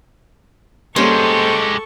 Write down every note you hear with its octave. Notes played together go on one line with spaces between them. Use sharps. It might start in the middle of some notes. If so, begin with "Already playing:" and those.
G3 G#3 A#3 C#4 G4 A4 C5 C#6